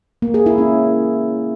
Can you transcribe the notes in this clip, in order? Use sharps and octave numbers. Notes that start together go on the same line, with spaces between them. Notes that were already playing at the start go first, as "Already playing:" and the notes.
A#3
G#4
E4
C#4